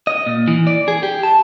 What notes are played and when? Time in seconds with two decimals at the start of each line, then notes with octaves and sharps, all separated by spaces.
0.07 D#5
0.26 A#2
0.48 E3
0.67 D5
0.88 G#4
1.03 G4
1.23 A5